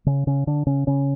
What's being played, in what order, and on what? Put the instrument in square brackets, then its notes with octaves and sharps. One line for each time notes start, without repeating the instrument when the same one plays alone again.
[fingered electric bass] C#3 C#4
C#3 C#4
D3 D4
C#3 C#4
C#3 C#4